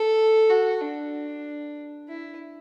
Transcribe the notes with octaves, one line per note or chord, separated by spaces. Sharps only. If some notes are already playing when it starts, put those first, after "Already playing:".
Already playing: A4
F#4
D4
E4